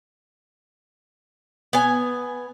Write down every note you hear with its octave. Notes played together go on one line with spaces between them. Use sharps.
B3 G#5